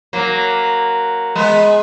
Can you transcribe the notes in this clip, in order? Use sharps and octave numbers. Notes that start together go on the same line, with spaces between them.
F#3 A#3
G#3 B3